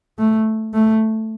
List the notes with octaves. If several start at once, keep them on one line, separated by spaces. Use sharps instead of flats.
A3
A3